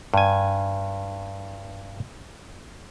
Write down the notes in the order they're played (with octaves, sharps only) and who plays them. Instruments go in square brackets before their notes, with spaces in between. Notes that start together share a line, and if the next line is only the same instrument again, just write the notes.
[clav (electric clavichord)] G2 G#5